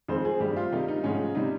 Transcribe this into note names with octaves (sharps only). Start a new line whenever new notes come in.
F2 D#3 G#3 C5
G#4
G2 G3 G4
F4
C3 D#3 G3 D#4
D#4
G#2 F3 G#3 C#4
C3 G3 D#4